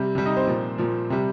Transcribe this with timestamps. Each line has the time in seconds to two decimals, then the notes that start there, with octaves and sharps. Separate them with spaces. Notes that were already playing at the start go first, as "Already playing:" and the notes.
Already playing: C3 G3
0.15 C3 G3
0.26 D#4 D#5
0.37 C4 C5
0.47 A#2 F3
0.78 A#2 F3
1.10 C3 G3